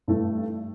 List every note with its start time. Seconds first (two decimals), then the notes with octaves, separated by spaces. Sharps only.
0.08 G2 E3 A3